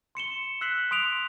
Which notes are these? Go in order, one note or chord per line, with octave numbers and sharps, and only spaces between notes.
C6 C#7 E7 G7
E6 F#6 B6 C7 F#7
C6 D#6 D7 F7